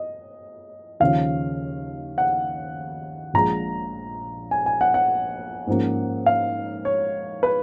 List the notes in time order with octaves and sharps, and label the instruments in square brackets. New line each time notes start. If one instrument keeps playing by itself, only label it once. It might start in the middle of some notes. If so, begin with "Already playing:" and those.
Already playing: [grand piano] D#5
D#2 C#3 F3 F5
F#5
A#1 A#2 G#3 A#5
G#5
G#5
F#5
F#5
G#2 F3 A#3 C#4
F5
C#5
B4